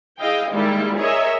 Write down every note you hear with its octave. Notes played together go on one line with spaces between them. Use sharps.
E4 G#4 D#5 F5 G5
D#3 G3 G#3 A#3 E4
G#4 A#4 C#5 D#5 E5